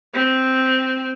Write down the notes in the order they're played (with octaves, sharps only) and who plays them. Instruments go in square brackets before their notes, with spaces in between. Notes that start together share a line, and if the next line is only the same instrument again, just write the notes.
[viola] C4